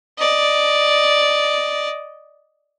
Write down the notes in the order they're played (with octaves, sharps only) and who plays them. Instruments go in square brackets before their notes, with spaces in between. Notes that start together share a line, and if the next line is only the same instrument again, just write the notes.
[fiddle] D5 D#5